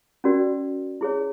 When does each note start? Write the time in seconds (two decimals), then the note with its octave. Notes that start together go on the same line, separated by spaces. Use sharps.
0.24 C#4 F#4 A#4 D5
1.01 E4 G#4 C#5